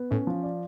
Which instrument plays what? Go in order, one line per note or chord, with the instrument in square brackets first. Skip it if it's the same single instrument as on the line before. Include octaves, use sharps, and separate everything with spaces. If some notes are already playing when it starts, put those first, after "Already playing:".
Already playing: [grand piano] B3
[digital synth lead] A2 [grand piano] C#4
[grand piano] F3
D5